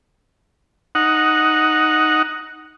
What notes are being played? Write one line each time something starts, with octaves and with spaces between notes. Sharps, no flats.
D#4 F#5